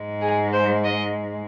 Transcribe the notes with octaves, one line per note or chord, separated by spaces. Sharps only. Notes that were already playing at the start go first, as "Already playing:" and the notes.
Already playing: G#2 G#3
G#4
C5
D#5